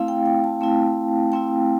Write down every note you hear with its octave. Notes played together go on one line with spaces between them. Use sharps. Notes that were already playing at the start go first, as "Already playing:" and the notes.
Already playing: A3 C4 E4 F5
G5
G5
A5
A3 C4 E4
A3 C4 E4 G5